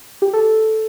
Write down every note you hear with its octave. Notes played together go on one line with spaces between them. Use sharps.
G4
A4